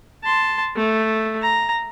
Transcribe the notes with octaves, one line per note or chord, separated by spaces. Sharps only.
A5 C6
A3
A#5